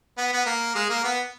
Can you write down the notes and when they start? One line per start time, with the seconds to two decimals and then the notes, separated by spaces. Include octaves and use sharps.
0.18 B3
0.33 B3
0.46 A#3
0.75 G#3
0.89 A#3
1.04 B3